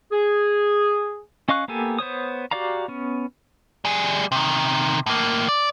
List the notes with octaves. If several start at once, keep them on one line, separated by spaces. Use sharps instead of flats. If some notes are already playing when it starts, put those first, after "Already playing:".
G#4
C#4 D#5 F5 C#6 F#6
A#3 B3 G4 A4 G#5
B3 C5 C#5 D#6
F#4 G4 D5 F5 A#5
B3 C#4
G3 G#4
C3 D#3
A2 A#3
D5